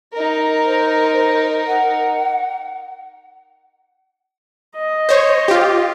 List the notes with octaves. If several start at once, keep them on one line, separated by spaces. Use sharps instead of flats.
D#4 A#4
C5
F#5
D#5
C5 C#5
F4 G4